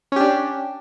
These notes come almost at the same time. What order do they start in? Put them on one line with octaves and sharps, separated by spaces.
C#4 G4 D4